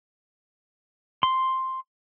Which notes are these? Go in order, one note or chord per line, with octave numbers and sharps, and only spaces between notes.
C6